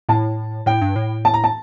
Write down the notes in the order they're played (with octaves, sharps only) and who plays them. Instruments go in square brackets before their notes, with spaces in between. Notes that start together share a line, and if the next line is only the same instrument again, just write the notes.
[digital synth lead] A2 [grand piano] A5
[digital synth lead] A2 [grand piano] G5
[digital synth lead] G2
A2
[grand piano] A5
A#5
A5